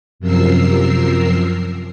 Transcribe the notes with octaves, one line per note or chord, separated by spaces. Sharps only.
F#2 C3 F3 A#4 E6 C7